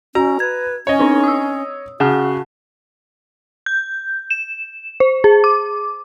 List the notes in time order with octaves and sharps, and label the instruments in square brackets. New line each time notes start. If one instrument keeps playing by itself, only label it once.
[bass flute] C#4 [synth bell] F#4 [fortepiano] A#5
[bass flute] B4 [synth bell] G#6
[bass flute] C#4 [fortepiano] C#5 D#5
[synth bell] C4 D4 D#4
D#6 E6
[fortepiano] C#3 [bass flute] F#4 [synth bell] G#4 F#5 A5
[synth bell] G6
E7
C5
G#4
D6